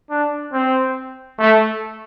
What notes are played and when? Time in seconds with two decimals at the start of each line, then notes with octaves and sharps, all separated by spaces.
0.10 D4
0.53 C4
1.39 A3